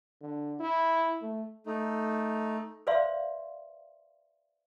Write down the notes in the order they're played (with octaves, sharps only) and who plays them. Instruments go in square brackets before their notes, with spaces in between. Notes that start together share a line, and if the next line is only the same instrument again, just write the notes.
[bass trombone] D3
E4
A3
[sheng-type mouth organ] A3 D#4
[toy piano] B4 C5 D5 E5 F5 C6